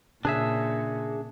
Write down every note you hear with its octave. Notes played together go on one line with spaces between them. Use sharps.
A#2 C#3 D4 G#4 E5